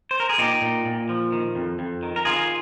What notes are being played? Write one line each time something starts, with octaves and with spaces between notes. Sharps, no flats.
C5
A#4
G#4
A#2 D#4 G4
A#2
A#2
F3
D#3
F2
F2
D#3
A#4
D#3 F4 G#4